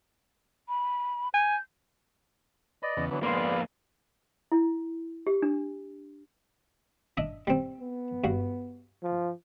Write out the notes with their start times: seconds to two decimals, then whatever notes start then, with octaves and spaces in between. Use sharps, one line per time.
0.69 B5
1.34 G#5 G6
2.83 B4 D5 D#5
2.97 E2 C#3 B3
3.11 D3 E3 F#3 B3
3.23 F2 G#2 A#3 B3 B4 D5 F5 C6
4.52 E4
5.27 G4
5.42 D4
7.17 D4 D#5 E5
7.47 G3 C4
7.81 B3
8.24 G2 F#4
9.03 F3